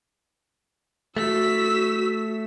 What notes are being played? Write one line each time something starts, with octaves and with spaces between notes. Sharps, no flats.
A3 F#4 E6 B6